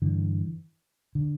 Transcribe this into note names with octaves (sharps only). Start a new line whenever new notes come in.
G2 D3 E3
D3